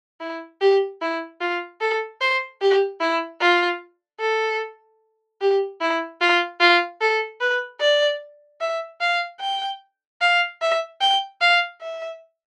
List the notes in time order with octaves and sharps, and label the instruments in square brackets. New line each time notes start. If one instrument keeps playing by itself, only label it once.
[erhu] E4
G4
E4
F4
A4
C5
G4
E4
F4
A4
G4
E4
F4
F4
A4
B4
D5
E5
F5
G5
F5
E5
G5
F5
E5